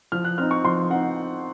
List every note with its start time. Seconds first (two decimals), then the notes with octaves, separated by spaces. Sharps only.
0.12 F3 F6
0.25 F#6
0.38 C4 D#4 F6
0.51 C#6
0.64 F3 C6
0.90 C4 D#4 F#5